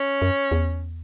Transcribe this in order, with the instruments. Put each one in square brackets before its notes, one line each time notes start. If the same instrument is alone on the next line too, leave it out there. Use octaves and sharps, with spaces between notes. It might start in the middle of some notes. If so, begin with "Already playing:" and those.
Already playing: [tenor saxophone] C#4
[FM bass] F#2
E2